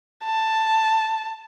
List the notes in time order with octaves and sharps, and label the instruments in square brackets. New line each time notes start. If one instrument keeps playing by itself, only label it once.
[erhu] A5